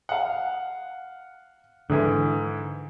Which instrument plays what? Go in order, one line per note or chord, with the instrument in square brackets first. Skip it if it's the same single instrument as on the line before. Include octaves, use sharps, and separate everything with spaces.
[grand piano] F5 F#5
[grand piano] G#2 E3 [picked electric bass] D3